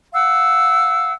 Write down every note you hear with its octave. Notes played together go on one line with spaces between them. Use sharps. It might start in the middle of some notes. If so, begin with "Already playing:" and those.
F5 F#5 E6